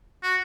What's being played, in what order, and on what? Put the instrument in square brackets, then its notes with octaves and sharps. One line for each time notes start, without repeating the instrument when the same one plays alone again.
[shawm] F#4